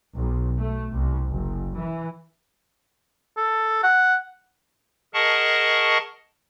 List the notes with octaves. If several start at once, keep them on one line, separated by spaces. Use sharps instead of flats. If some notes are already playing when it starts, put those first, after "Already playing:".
B1
A3
C2
F#1
E3
A4
F#5
G#4 A#4 D#5 F#5 A5 C#6